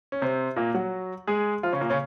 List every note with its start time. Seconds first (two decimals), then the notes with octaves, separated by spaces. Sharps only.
0.12 C#4
0.21 C3 C4
0.56 A#2 A#3
0.74 F#3 F#4
1.27 G#3 G#4
1.63 F3 F4
1.73 C#3 C#4
1.81 A#2 A#3
1.90 C#3 C#4